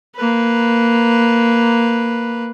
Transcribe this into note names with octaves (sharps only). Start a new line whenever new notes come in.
A#3 B4